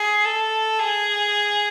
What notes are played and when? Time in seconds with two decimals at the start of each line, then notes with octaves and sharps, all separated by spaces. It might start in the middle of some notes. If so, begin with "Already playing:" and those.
Already playing: G#4
0.25 A4
0.79 G#4